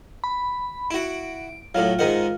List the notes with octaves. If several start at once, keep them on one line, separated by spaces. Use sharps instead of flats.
B5
E4 F#4 D7
A2 F#3 F4
G#2 D#3 F#5